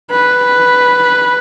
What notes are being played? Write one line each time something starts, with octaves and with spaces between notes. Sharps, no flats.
B4